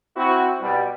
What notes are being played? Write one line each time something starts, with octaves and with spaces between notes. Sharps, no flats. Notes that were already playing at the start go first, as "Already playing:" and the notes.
C4 E4 F#4
B2 G3